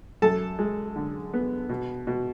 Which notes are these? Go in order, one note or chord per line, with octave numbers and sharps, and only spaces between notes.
F#2 A4 A5
G#3
D3
B3
B2
B2